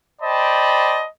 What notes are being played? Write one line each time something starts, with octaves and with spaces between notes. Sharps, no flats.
C5 D5 D#5 G5 A5 B5